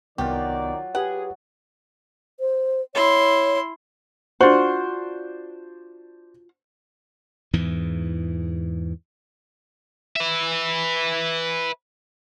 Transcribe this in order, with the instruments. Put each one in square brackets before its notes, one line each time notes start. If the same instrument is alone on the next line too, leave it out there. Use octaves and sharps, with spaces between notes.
[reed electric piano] C2 B3 [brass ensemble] D#3 D5 [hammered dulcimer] F#3 F4 [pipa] G4
[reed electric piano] G4 B4 [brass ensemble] G#4 [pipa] F#5
[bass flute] C5
[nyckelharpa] E4 C6 [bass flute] C#5
[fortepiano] D4 C5 [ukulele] F4 F#4
[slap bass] E2 G#2 E3
[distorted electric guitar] B4 E5